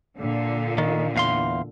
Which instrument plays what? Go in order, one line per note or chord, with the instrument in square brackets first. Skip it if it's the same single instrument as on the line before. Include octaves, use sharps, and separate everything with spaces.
[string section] A#2 D3
[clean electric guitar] D#3
E2 F5 C6